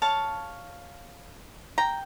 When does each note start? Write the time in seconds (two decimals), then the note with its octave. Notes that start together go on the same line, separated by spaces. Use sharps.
0.02 C#5 F5 A5
1.78 G5 A#5